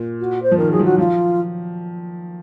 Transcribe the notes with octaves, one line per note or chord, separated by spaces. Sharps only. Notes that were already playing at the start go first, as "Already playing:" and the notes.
Already playing: A#2
F#4
C5
F3
D#3 A#4
F#3 G#4
F3
F#3 F#4
F3 F4